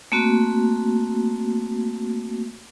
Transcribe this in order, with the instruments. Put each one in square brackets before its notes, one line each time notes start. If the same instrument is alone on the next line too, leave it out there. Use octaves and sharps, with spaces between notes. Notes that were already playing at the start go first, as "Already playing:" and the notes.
[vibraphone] A3 A#3 C4 F#4